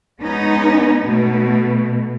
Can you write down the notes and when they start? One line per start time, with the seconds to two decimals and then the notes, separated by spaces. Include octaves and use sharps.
0.21 G#3 B3 C#4 D#4
0.99 B2 A3